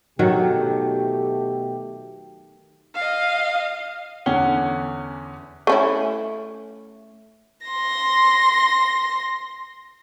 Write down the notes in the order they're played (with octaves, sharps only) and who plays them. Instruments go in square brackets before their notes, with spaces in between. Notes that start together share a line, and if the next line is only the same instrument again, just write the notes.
[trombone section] B2 A3 G4 [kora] D#3 F#3 F#4
[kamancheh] D#5 F5
[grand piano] E2 D3 C#4 F#5 G7
[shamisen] A3 C#4 E4
[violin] C6 A#6